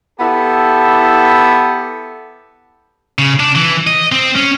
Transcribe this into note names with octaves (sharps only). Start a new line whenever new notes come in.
B3 E4 G4 A4
C#3
D4
E3
D#5
C4
C#4